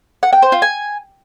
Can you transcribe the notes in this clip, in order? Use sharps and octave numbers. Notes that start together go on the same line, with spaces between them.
F#5
G5
C5
F4
G#5